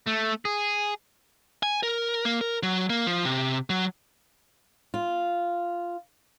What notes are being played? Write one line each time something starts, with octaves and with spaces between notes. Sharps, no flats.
A3
G#4
G#5
A#4
A#3
A#4
F#3
A#3
F3
C3
F#3
F4